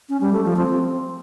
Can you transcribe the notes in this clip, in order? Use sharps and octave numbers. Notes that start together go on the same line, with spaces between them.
C#4
G3
A3
F3
C4